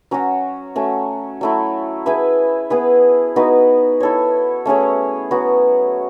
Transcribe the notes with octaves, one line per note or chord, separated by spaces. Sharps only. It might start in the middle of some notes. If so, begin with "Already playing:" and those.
F#3 C#4 F#4
A3 C#4 F#4
F#3 A3 E4
E4 G#4 B4 E5
B3 E4 G#4 B4
B3 D#4 F#4 B4
E4 A4 C#5
A3 C#4 G#4 C#5
F#3 B3 F#4